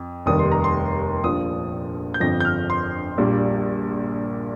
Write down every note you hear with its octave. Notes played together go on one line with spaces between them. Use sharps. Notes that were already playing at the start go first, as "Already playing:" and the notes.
Already playing: F2
F1 D#2 D#3 G3 D#6
C6
A#5
C6
A#1 A#2 F3 D#6
G6
G1 F2 F3 A#6
G6
F6
C6
A#1 A#2 G3 A#3